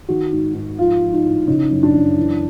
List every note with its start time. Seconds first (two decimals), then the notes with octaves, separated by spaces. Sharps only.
0.09 D#3 F#4
0.32 G#2
0.55 G#2
0.78 F3 F4
1.02 F3
1.13 D#4
1.24 A2
1.47 C#3 D#4
1.70 F#2
1.83 D4
1.94 F#2
2.17 E3